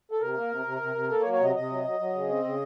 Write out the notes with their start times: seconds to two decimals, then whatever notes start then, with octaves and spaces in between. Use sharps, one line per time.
0.11 A4
0.21 C3 A#4
0.36 A#3
0.51 C3
0.66 C3
0.81 C3
0.95 C3
1.10 A#3 A4
1.22 C#5
1.26 F#3
1.33 C#5
1.40 C3 D#5
1.55 C3 D#5
1.70 F#3
1.85 F#3
2.00 F#3
2.15 C#3
2.29 C4
2.44 C#3